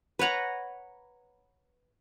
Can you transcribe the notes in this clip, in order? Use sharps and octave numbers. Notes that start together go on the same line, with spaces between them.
B4 C#5 F#5 A#5